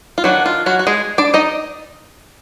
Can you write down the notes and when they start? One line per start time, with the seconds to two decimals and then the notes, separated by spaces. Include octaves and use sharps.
0.18 F4
0.24 D#3 F#3 D4 F#4
0.46 F4
0.66 F#3 F#4
0.79 F#4
0.87 G#3 G#4
1.18 D4 D5
1.34 D#4 D#5